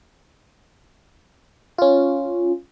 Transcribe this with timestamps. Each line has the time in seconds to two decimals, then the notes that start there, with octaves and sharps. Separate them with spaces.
1.78 C#4 F4